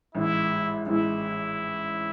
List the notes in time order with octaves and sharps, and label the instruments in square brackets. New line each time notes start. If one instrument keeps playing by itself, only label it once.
[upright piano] A1 G#2 E3 G#3 [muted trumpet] E4
[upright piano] A1 G#2 E3 G#3 [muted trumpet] E4